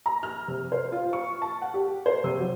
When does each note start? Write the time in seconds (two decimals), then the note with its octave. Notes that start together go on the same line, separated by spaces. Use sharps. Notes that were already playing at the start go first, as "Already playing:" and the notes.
0.06 A#5
0.23 F6
0.48 C3
0.72 C5
0.92 F4
1.13 C#6
1.42 A5
1.62 F#5
1.74 G4
2.06 C5
2.24 C3
2.40 F#3